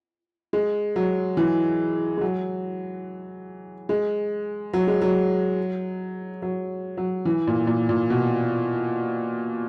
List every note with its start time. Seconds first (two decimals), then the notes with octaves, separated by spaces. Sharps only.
0.53 G#3
0.96 F#3
1.37 E3
2.17 G#3
2.21 F#3
3.89 G#3
4.73 F#3
4.87 G#3
5.02 F#3
6.42 F#3
6.97 F#3
7.25 E3
7.47 A#2
7.67 A#2
7.89 A#2
8.10 B2